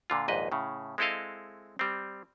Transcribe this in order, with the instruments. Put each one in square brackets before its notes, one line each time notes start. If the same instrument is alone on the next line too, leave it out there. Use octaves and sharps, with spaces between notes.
[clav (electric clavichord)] A#2 D3 F4
A#1 D#2 G#2 B4 D#5
A2 C#3
G#3 C4 E4 A4 D#5 F5
G3 C4